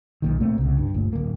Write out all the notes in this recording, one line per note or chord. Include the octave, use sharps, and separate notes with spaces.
B1 A#2 D#3
A#2 A3 A#3 C4
C2 C#3
G2
G1 D2 A#2
D1 A#3